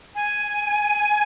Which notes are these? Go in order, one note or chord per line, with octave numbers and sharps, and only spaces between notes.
G#5